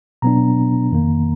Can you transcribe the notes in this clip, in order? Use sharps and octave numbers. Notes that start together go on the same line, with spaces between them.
B2 F#3 B3 D4 A#5
F2 D#3 A#3